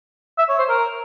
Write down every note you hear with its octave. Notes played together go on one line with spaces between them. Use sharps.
E5
C#5
C5
A#4